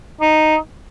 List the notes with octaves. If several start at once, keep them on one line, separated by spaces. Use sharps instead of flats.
D#4